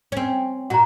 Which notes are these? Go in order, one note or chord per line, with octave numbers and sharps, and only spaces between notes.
C4 C#4
A#2 F#4 F#5 A#5